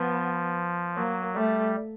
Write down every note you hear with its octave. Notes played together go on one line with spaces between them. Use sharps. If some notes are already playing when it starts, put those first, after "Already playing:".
Already playing: F3 B3
F#3 A#3
G3 A3